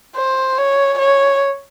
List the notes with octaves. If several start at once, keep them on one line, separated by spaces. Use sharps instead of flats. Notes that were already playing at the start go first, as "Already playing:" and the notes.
C5
C#5
C#5